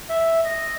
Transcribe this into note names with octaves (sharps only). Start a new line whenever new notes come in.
E5
D#5